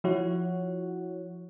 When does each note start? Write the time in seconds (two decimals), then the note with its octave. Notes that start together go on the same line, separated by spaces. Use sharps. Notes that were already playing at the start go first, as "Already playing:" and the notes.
0.04 F3 E4 F#4 C#5 F#5